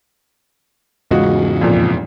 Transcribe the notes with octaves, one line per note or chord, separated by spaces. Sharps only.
E2 G#2 C#3 G#3 F4 F#4
F2 A#2